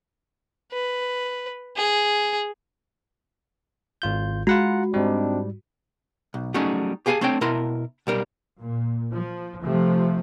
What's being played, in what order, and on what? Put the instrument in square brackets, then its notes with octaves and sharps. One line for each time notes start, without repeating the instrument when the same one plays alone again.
[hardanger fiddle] B4
G#4
[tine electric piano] G#1 F4 G6
[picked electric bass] G#3 [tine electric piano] F4 F#5 A#5 [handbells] F#4
[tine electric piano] G#2 G3 [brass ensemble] C4 D4 D#4
[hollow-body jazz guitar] B1
F#3 G3 A3 C#4 D#4 G#4
G4 G#4 F5 F#5 G#5 A5
A3 C4 D4 C#5 G5
B2 E4 A#4 A5 C6
B1 G3 A#4
[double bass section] A#2
F3
C3 F3 A3